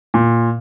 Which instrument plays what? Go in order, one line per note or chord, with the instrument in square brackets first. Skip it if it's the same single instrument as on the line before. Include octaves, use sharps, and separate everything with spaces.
[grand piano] A#2